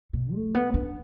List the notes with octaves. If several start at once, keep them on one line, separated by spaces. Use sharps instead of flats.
B2
A3
B3
D4